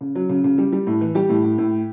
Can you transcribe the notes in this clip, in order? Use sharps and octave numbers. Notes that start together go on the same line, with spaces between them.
C#3
F#3
C#3
C#3
G3
G3
A2
E3
G3 G4
A2
A2
A2